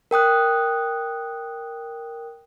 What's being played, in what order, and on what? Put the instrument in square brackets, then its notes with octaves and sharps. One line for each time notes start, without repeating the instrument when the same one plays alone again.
[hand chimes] A#4 G5 D#6 F#6